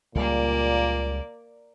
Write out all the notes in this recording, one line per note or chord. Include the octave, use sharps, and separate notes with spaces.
C#2 A#2 C#3 G3 A#3 D5